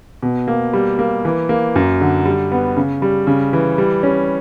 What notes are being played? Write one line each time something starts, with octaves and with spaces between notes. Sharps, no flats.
B2
A#3
G3
A#3
E3
A#3
F#2
D3
G3
B3
C#3
G3
C#3
E3
G3
C#4